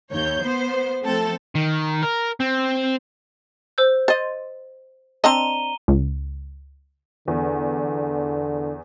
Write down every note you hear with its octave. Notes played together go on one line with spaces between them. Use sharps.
D#2 C#5 G6
B3 C5
F3 A3 C4 A4
D#3
A#4
C4
C5 E6 G6
C5 D#5 A6
C4 D4 D#5 A#5 D#7 G7
C#2
E2 D3